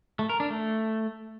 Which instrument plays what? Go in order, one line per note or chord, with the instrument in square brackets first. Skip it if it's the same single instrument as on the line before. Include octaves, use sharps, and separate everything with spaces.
[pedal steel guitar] A3
A#4
D4
A3